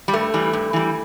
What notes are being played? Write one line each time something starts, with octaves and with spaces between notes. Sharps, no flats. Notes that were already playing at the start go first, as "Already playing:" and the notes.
G3
G2 A3
E3 G3
G2
E3 G3